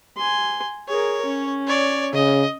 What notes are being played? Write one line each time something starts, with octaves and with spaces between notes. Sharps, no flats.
G#5 C6
G#4 A#4 C#5
C#4
C#5 D5
C#3 D#5